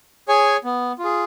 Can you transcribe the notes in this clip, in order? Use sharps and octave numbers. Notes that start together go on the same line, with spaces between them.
G#4 C#5 G#5
B3
F4
G#4